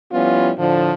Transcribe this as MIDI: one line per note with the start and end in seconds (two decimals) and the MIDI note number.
0.12 0.52 53
0.12 0.52 55
0.12 0.52 59
0.12 0.52 61
0.12 0.52 64
0.12 0.52 65
0.58 0.93 45
0.58 0.93 50
0.58 0.93 53